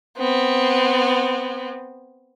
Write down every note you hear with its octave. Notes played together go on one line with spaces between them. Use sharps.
B3 C4